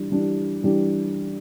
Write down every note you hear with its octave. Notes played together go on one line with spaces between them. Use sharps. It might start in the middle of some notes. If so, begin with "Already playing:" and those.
Already playing: E3 G3 D4 G4
E3 G3 D4 G4
E3 G3 D4 G4